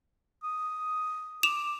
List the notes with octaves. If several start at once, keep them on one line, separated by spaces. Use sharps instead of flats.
D#6
D6 E7 F7